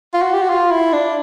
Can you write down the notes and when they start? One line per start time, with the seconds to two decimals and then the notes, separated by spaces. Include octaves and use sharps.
0.14 F4
0.22 F#4
0.33 G4
0.42 F#4
0.50 F4
0.71 E4
0.93 D4